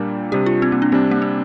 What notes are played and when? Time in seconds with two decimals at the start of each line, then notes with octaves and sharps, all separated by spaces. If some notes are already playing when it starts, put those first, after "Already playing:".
Already playing: A#2 G3 A#3 D4 A#4
0.32 C3 G3 D4 G4
0.46 F4
0.62 C4
0.72 A#3
0.82 D4
0.92 C3 G3 C4 D4
1.11 A#3
1.22 C4